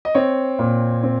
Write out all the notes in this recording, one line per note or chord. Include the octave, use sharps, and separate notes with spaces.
D#5
C4 C#5
A#2
C4